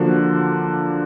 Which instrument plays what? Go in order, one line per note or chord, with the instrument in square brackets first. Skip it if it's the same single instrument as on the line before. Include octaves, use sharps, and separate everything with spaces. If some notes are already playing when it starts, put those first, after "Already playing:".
Already playing: [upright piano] D3 [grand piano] F3 A#3 D4 F#4